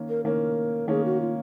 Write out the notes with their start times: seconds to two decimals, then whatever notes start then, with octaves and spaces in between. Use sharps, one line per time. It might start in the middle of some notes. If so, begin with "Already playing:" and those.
Already playing: D#3 A#3 C#4
0.09 A#4
0.24 D#3 A#3 C#4 A#4
0.88 D#3 A#3 C#4 G#4
1.05 F#4
1.21 F4